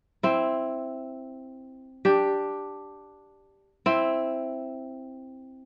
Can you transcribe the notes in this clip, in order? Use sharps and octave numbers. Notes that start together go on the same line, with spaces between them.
C4 E4
D4 G4
C4 E4